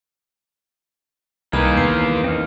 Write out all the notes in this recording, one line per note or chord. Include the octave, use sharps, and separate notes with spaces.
C2 D#3 G#3 A#3 G#4 B4 A#5 B5
E2 B4 C6
C4 D#4 F6